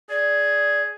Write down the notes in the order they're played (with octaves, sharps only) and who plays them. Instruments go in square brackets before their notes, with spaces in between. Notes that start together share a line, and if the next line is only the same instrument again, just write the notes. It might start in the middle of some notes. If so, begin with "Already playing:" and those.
[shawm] G#4 [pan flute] D5